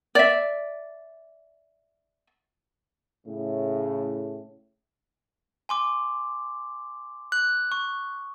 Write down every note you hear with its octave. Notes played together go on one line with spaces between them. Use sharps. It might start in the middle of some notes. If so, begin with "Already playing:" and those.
D5 E5
A2 C#3
G#5 C6 D6
F#6
C#6